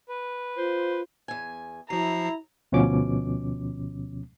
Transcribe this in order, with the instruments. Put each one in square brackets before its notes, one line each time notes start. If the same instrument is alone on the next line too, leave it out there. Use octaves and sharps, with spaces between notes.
[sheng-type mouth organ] B4
[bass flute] F4 [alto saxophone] C5
[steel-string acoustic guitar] E2 G#5
[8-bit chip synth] F3 C7 [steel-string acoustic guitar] F#3 [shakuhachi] E4 [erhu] A#5
[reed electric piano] D2 B2 F3 C#4 D6